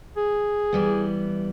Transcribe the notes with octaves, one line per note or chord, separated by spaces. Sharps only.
G#4
E3 G3 B3